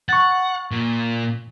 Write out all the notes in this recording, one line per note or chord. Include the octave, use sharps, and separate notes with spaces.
F#5 C#6 A6
A#2